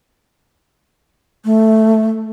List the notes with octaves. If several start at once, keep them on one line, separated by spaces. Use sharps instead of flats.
A3